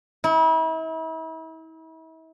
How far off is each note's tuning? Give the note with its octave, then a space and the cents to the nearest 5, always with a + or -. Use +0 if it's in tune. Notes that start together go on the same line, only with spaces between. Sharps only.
E4 -40